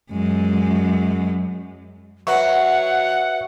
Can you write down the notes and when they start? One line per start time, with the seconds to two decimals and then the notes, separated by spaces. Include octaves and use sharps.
0.11 F#2 G#3
2.27 F#3 B4 E5 F#5 C#6